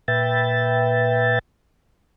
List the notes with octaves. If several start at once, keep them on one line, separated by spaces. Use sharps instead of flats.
A#2 B4 E5 G5 A6